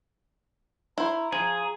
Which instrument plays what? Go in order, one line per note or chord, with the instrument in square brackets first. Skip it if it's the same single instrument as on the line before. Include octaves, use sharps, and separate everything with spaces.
[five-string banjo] E4 C5 [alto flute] A#5
[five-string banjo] F3 [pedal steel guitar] G#4